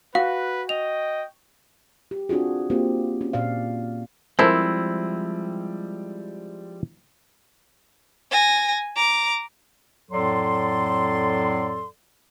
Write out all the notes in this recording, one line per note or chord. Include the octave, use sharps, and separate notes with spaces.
F#4 B4 F5
D#5 G5 F7
G4
C4 D4 F4 F#4 G#4
A#3 C4 F4 G4
C#4
A#2 D5 F5
F3 G3 G#3 C4 E4 A4 A#4 C5
G#5 A#6
A#5 D6
F2 A2 F#3 A4 D5 C6